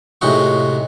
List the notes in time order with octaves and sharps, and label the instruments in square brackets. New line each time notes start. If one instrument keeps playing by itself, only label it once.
[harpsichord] A2 C3 G#3 D#4 F#4 C#6